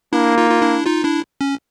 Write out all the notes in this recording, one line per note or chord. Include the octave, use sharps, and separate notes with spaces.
A#3 D4 E4
D#4 F4
F4
D4 E4
D#4 F4
D4 E4
C#4